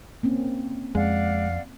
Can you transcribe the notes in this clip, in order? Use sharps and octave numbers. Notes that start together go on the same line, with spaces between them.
A#3 C4 C#4
F2 G#3 D5 F5 F#5